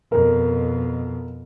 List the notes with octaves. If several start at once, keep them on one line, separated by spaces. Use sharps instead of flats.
F2 B2 A#4